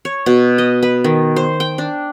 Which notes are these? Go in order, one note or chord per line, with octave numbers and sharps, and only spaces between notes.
C#5
B2
D#5
B4
D#3
C5
G5
D4